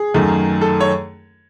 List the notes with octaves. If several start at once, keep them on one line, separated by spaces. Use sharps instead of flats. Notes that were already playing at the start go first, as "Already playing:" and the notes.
Already playing: G#4
F#2 D#3 A3
A4
C#5